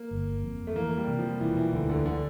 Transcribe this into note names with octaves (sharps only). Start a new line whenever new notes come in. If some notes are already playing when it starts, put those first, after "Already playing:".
Already playing: A#3
G1
F2
A3
E3 A#3
G3
C3
F3
E1 E3
E3
D2 D3
D3
D3